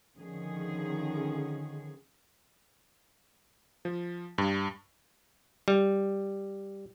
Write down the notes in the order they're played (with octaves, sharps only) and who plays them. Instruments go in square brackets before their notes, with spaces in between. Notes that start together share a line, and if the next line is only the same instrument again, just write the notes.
[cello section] D3 D#3 F3 C#4 G#4
[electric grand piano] F3
G2
[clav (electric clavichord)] G3